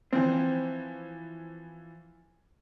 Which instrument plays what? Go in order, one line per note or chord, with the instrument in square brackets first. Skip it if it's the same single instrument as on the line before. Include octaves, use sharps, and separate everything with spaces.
[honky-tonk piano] E3 F3 [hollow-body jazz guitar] C4